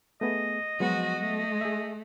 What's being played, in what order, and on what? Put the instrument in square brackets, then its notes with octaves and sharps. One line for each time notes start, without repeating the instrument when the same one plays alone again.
[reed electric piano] A3 B3 G#4 [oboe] D#5
[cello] F3 F#4 [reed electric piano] F#3 G#3 B3
[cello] A3
[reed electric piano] G#4 E5